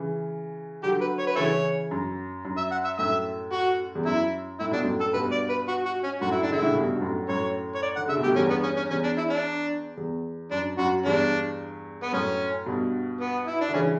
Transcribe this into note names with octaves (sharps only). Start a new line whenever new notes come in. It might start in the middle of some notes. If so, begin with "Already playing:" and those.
Already playing: C#3 E3
D3 F#3 G4
B4
C#5
B4
C#3 E3 E4 A4 C#5
F#2
F#2
E5
F#5
E5
F#2 A2 E5
F#4
E2
F#2 E4
A2 E4
B2 D4
F#2 A2
A4
G2 B2 B4
D5
B4
F#4
F#4
C#4
F#2 A2 F#4
E4
D4
C#3
D3 E4
A2 C#3
G2 B2
B2
F#2 A2
F#2 A2 C#5
C#5
D5
D3 F#5
C#3 E5
B2
A2 G4
E2 G2 C#4
B3
C#4
C#4
E2 C#4
D4
E4
D4
E2
F#2 D4
F#2 F#4
E2 G2 D4
B3
F#2 A2 C#4
G2 B2
B3
E4
D4
D3
C#3 E3 C#4